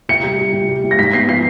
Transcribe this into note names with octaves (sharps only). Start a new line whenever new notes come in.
C3 C#7
G3
G3
C3
G3
C3
A#6
G#2 B6
B3 C7
F3 C7